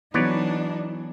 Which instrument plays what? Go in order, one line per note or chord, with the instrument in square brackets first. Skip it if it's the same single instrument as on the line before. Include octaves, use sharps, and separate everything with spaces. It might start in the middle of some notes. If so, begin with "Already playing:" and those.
[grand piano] E3 F#3 [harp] B3 [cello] D4 D#4 [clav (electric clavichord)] B4 C#5 D5